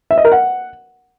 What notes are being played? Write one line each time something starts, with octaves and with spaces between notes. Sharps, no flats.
E5
D#5
A#4
F#5